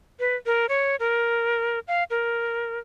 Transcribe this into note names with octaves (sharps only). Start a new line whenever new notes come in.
B4
A#4
C#5
A#4
F5
A#4